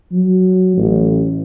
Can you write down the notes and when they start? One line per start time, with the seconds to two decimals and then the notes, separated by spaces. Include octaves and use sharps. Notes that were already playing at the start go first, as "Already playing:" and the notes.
0.12 F#3
0.77 A1